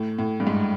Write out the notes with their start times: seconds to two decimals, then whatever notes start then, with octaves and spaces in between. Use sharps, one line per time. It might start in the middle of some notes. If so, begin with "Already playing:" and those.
Already playing: A2
0.19 A2
0.40 G2
0.47 G#2